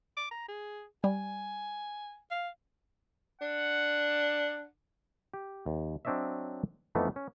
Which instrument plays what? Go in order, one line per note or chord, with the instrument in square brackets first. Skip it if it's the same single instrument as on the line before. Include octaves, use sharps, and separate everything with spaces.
[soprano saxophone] D6
A#5
G#4
[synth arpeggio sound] G3 [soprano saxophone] G#5
[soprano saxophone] F5
[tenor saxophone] D4 [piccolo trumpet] F#5
[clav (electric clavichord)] G4
D#2
F#3 C4 D4 C#5 D#5 E5
F2 E3 A3 B3 D#4
C#4